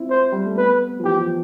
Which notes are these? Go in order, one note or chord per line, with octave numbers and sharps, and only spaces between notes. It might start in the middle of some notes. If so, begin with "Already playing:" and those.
Already playing: C4 E4 F4
C5
G3
A3
B3 B4
F3
E3 G4
F3